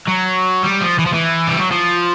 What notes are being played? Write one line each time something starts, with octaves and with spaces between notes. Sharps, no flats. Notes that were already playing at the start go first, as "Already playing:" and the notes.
F#3
G3
F3
E3
F3
E3
G3
F#3
F3